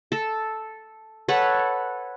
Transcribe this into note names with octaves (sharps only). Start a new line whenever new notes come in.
A4
A4 B4 C#5 F#5